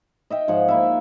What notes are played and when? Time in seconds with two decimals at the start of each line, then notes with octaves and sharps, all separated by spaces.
0.30 D#5 E5 G5
0.48 G#2 F3 C#5 F#5
0.68 A#3 E4 E5